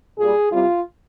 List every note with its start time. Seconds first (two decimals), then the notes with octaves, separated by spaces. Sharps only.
0.18 A#2 G3 G#4
0.52 C3 G3 F4